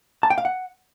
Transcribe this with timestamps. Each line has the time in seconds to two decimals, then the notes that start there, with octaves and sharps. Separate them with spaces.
0.23 A5
0.30 G5
0.38 F5
0.45 F#5